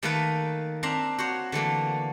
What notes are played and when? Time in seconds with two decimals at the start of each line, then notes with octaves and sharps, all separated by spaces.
0.03 D#3 A3 A#3 D#4 A4 B4
0.83 C4 D4 E5 F5 A#5
1.18 F#4 C5 C#5
1.52 D3 E3 A3 A#3